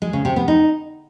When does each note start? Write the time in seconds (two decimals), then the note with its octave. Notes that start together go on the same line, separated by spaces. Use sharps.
0.02 G#3
0.13 C#3
0.25 C3
0.36 B3
0.48 D#4